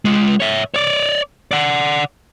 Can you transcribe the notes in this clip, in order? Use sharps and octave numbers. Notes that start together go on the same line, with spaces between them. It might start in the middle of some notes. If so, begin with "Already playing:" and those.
G#3 F4
C#5 E5
C#5 D5
D5 F#5